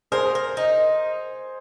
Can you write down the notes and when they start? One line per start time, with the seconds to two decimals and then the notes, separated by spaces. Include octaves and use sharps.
0.12 G#4 A#4 C5
0.35 A#4
0.57 D#4